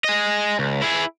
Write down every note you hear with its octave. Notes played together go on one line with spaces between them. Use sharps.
G#4 D#5
C#2
E4 G#4